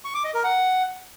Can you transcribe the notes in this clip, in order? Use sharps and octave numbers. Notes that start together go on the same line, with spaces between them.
C#6
D6
D#5
A#4
F#5